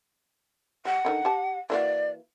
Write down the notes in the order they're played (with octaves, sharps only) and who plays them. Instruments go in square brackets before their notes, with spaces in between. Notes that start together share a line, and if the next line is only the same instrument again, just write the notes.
[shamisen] G3 [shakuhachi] F#5
[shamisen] D3 D#3 D#4
G4 A5
[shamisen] E3 A#3 F#4 [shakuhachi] D5